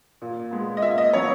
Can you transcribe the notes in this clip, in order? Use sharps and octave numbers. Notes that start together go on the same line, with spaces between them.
A#2
G#3 B3
D#5
A#2 E5
D#5
F#3 B3 C#5